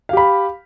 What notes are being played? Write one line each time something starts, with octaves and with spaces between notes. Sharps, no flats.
G4 F5 B5